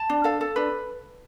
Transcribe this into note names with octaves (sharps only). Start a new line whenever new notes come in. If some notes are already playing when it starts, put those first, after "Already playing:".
Already playing: A5
D4
A4 F5
A4
D4 B4